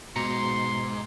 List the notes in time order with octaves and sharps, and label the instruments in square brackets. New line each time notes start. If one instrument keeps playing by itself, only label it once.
[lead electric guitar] G#2 [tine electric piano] B2 A#5 C#7 [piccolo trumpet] C6